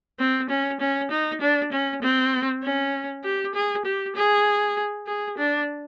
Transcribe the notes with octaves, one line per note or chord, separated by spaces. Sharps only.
C4
C#4
C#4
D#4
D4
C#4
C4
C#4
G4
G#4
G4
G#4
G#4
D4